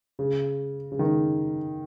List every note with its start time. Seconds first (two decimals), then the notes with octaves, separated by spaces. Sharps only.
0.19 C#3
0.92 C#3
0.99 D#3